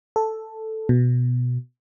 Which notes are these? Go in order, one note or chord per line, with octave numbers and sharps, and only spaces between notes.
A4
B2